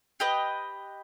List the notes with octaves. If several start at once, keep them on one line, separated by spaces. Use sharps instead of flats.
G4 B4 D#5